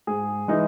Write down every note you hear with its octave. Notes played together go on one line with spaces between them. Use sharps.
G#2 G#4
E3 G#3 D#4